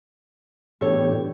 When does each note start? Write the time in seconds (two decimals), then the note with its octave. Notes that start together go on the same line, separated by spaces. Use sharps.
0.81 A2 E3 B3 D4 G4 A4 C#5